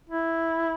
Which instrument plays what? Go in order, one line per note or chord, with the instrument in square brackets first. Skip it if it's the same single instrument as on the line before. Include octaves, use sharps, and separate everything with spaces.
[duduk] E4